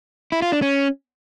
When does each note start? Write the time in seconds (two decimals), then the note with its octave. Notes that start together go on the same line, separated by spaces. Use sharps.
0.32 E4
0.42 F4
0.52 D4
0.62 C#4